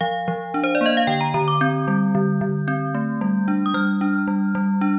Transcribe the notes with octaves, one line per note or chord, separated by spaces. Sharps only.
F3 F5
F3
D4
C5
D5
A#3 D#5
F5
D3 G5
A#5
D3 A#5
D6
C4 G6
G3
D3
D3
C4 G6
A3
G3
D4
D#6
G3 F6
D4
G3
G3
D4